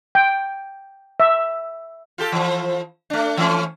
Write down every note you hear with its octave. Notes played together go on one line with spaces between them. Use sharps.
G5
E5
F4 G4 A4
E3 F3
A3 D4
E3 A3 C#4